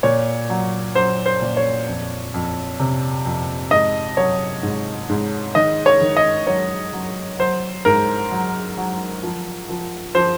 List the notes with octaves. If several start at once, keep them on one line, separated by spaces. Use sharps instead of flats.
A#2 C#5
F#3
F#3 C5
C5
A#2
C#5
F2
F2
C3
F2
G#2 D#5
F#3 C#5
G#2
G#2
D#3 D#5
C#5
D#3
D#5
F#3 C#5
F#3
F#3 C5
G#2 A#4
F#3
F#3
F3
F3
F3 C5